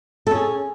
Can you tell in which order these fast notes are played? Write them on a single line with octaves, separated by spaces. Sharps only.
A4 C#4 G#4